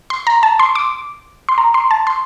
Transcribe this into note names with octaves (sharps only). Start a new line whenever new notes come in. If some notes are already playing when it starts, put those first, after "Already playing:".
C6
A#5
A5
C6
D6
C6
A#5
C6
A5
C6